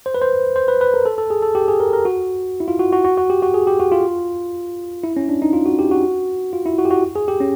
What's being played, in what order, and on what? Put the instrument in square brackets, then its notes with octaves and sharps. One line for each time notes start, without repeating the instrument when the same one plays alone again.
[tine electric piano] C5
B4
C5
C5
B4
B4
A#4
A4
A4
G#4
A4
G4
G#4
A#4
A#4
F#4
E4
F4
F#4
F#4
F#4
F#4
G4
F#4
G#4
G4
F#4
F4
E4
C#4
D4
D#4
F4
F#4
G4
F#4
F4
E4
F#4
G4
F#4
G#4
G4
C#4